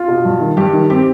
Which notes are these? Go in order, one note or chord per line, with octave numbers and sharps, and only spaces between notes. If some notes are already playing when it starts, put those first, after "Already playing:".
Already playing: F4
B2
G2
D#3
G2 G4
D#3
C4 G4